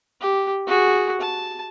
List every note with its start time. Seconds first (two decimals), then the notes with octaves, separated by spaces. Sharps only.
0.21 G4
0.67 F#4 G#4
1.21 A5